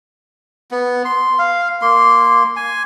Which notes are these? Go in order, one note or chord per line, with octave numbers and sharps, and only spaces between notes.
B3
C6
F5
A#3 C6
G#5